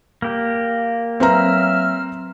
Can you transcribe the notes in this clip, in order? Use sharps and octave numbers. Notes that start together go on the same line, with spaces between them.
A#3 G4
F#3 C4 B4 E5 A#5 F6